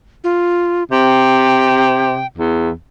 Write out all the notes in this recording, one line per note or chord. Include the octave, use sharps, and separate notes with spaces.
F4
C3 G5
E2